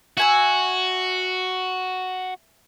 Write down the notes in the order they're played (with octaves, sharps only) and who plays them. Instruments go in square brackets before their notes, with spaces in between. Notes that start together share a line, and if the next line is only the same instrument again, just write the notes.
[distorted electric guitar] F#4 [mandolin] E5 G#5 E6